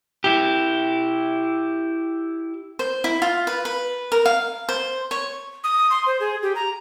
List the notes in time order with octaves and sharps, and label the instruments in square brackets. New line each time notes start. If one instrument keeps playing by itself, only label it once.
[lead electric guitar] E4 G4
[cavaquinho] C5
E4
F4
B4
B4
A#4
F5
C5
C#5
[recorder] D#6
C6
C5
G#4
G4
A#5